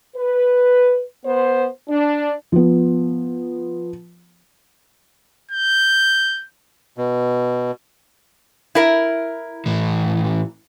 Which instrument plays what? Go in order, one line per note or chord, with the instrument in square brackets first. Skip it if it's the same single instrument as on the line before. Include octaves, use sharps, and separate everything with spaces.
[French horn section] B4
B3 C5
D4
[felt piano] F3 B3
[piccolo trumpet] G6
[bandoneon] B2
[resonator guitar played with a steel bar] E4 A#4
[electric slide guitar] A2 E3